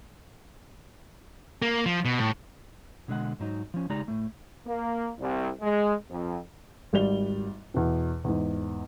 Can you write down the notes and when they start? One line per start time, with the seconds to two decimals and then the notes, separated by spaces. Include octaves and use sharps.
1.62 A#3
1.86 F3
2.05 B2
2.19 A2
3.08 B2 D3 G#3 F#5
3.40 G#2 F#3 D#4
3.74 F3 C#4
3.89 C#3 G#3 D#4 G4 D5 A#5
4.08 A2 A3
4.67 A#3
5.19 C2
5.62 G#3
6.10 F2
6.93 G#1 G3 D5 F7 G7
7.74 E2 B2
8.24 E2 G#2